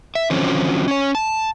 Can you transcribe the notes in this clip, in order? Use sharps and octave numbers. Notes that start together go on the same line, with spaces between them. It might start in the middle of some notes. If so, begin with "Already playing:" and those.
E5
D3 D#3 F3 F#3 C4 C#4
C#4 C#5
A5